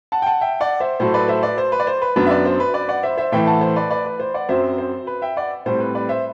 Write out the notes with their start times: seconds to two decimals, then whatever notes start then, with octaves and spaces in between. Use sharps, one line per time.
0.12 F#5 A5
0.22 G5
0.26 F#5 A5
0.41 E5 G5
0.60 D5 F#5
0.80 C5 E5
1.00 A2 F#3 A3 C5
1.14 B4 D5
1.28 C5 E5
1.43 B4 D5
1.58 C5
1.72 B4
1.80 D5
1.87 C5
2.02 B4
2.16 F#2 F#3 B3 D4 B4
2.26 E5
2.30 B4 D5
2.45 C5
2.60 B4
2.74 B4 D5
2.89 D5 F#5
3.03 C5 E5
3.18 C5 E5
3.32 A2 E3 A3 E5 G5
3.47 F#5 A5
3.61 C5
3.76 B4 D5
3.90 B4 D5
4.06 B4
4.20 C5
4.34 D5 F#5
4.49 F#2 F#3 C4 C5 E5
4.78 C5
5.07 B4
5.22 E5 G5
5.37 D5 F#5
5.66 A2 G3 C4 C5
5.80 B4
5.95 B4 D5
6.09 C5 E5